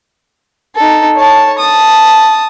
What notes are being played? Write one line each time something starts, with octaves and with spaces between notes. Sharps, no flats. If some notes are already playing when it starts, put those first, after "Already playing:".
D#4 A4
C#5 A5
A5 D#6